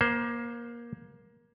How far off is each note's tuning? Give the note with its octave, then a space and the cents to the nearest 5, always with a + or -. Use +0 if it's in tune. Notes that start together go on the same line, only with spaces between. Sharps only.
A#3 +20 C5 +0